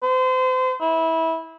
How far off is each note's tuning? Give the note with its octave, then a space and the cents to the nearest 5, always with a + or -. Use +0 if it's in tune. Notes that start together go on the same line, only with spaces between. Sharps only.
C5 -35
E4 -20